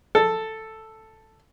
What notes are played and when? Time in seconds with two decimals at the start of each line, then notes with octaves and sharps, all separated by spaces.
0.15 A4